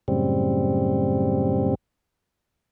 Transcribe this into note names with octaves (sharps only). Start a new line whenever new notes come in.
F#2 A2 C#3 G3 C4